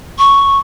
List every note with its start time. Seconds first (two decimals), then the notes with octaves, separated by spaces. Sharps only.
0.19 C#6